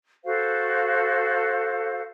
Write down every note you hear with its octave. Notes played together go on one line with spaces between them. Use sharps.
F#4 A4 C5 F5